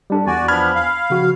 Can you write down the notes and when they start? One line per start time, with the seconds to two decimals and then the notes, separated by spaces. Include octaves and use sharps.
0.10 G3 D4 A4
0.26 E2 F#4 D5 G#5
0.48 F3 B3 D4 B5 F6 G#6
0.75 F5
1.10 C#3 F3 F#4